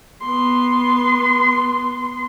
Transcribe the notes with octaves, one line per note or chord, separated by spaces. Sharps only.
B3 C6